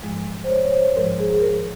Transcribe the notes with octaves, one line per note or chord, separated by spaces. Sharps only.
G#2 F3 G#3
C5
C#5
C#5
C5
G#2 F3 G#3 A#4
G#4
A#4